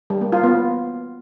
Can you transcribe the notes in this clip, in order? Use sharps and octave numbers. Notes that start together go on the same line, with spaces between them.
G3
A#3
F4
B3